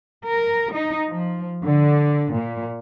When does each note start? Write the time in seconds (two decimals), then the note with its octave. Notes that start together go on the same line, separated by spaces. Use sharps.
0.25 A#4
0.72 D#4
1.09 F3
1.63 D3
2.34 A#2